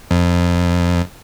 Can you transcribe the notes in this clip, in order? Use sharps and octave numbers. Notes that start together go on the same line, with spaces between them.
F2